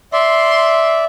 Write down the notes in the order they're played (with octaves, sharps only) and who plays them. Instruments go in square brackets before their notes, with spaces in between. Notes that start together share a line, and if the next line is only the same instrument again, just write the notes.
[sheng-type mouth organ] D5 E5 [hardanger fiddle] C6